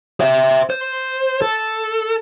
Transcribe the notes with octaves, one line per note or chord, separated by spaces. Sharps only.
C5 E5
C5
A4